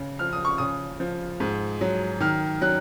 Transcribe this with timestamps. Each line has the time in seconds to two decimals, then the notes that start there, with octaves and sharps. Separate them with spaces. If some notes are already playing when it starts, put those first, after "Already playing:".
Already playing: C#3
0.19 F3 F6
0.33 D#6
0.45 C#6
0.58 C#3 D#6
1.00 F3
1.40 G#2
1.81 F#3
2.20 D#3 F6
2.61 F#3 F#6